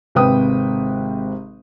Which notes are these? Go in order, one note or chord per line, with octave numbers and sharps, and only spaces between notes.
G#1 C3 B4 G5 D#6